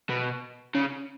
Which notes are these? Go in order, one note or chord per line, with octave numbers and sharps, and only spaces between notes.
B2
C#3